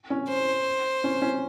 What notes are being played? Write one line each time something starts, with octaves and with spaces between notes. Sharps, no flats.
C#4
C5
C#4
C#4